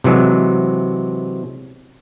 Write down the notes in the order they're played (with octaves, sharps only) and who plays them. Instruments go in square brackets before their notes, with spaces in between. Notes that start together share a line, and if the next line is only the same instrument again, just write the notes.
[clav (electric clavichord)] C3 E3 F#3 G#3